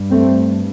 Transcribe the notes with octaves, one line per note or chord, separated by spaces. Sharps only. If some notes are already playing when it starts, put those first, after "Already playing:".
Already playing: G2
A3 C4